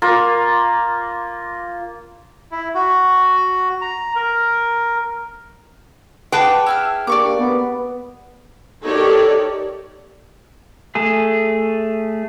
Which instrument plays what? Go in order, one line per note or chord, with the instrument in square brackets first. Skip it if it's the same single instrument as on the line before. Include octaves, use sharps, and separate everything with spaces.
[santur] A#3 F4
[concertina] E4
F#4
A#5
A#4
[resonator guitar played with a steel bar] G#4 B4 G5 [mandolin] A4 F#5 D6
[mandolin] E4 E5 F6
[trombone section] A#3 D4 G4 [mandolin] D5 C#6 D6
[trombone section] B3
[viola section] D#4 G4 A4 A#4 C#5 D5
[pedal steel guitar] A3 G#4